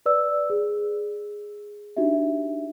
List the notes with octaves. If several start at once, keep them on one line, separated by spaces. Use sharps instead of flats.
B4 D5 E6
G#4
D4 D#4 F#4 G4 E5